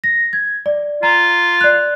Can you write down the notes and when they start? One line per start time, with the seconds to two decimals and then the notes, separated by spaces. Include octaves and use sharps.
0.04 A#6
0.33 G#6
0.66 D5
1.03 F4 A#5
1.61 D5 F#6